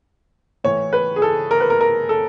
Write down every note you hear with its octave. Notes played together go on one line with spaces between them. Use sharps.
A2 E3 C#5
B4
G#4
A4
A#4
B4
A#4
A#4
A4